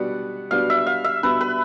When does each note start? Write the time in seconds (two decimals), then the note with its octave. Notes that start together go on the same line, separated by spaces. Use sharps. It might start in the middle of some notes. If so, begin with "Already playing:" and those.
Already playing: B2 G3 B3 D4 F#5
0.51 B2 G3 B3 D4 F5
0.70 E5
0.87 F5
1.04 E5
1.23 B2 G3 B3 D4 B4
1.41 B4